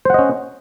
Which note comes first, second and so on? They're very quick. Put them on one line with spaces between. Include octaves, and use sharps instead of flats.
C5 F#5 D#5 C#4